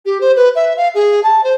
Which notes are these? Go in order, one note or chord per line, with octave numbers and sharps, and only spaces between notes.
G4
C5
B4
E5
F5
G#4
A5
C5